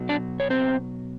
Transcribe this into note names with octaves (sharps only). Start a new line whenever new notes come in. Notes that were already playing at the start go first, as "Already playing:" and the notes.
Already playing: B2 F#3
D4 D5
C#5
C4 C5